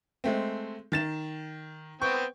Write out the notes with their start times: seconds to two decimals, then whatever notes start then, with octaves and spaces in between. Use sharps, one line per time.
0.24 G#3 A3 C4
0.92 D#3 A6 E7
2.02 B3 C4 G5 C#6